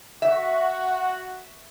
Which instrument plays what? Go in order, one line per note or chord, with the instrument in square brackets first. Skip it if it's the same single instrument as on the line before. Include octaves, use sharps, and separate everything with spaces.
[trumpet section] F#4 [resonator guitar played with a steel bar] E5